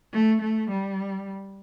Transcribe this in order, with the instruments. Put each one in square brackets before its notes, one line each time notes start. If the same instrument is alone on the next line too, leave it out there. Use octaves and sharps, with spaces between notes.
[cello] A3
A3
G3